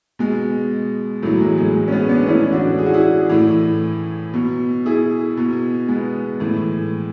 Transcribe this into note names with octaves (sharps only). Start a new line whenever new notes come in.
B2 G#3
A2 E3 F#3
G#3
G#3
G#3
C#4
G#3 B3
B3 D4
A2 E3 C#4 E4
D4 F#4
G#4
F#4
E4 G#4
A2 E3
B2
E4 G#4
B2
G#3 B3
A2 E3